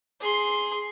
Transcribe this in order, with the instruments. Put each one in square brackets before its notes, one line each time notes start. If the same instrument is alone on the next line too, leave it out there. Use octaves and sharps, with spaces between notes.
[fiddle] G#4 C6